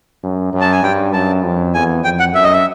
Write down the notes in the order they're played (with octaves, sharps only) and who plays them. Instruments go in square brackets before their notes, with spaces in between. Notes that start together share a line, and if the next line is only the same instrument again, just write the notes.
[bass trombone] F#2
F#2
[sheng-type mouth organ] A5
G#5
[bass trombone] G2 [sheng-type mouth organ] G5
[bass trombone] F#2 [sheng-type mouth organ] A5
[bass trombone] F2
[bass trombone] E2 [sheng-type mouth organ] G#5
[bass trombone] F2 [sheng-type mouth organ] G5
[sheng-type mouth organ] F#5
[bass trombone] F#2 [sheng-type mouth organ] E5
[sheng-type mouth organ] D#5
E5